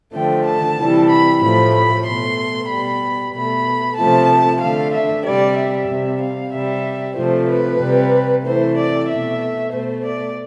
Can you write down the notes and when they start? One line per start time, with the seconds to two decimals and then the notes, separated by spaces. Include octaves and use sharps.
0.13 D3 F3 A3 G5
0.46 A5
0.78 C3 E3 G3
1.10 B5
1.42 A2 F3 A3 B5
1.74 B5
2.06 B2 A3 C6
2.69 G3 B5
2.74 B2
3.34 B2 A3 B5
3.97 C3 F3 A3 A5
4.61 D3 A3 F5
4.93 E5
5.25 C3 G3 D5
5.58 E5
5.89 C3 G3
6.21 F5
6.53 C3 G3 E5
7.17 C3 F3 A3 C5
7.48 B4
7.81 C3 G3
8.45 C3 E3 A3 C5
8.77 D5
9.09 B2 A3 E5
9.72 B2 A3 C5
10.05 D5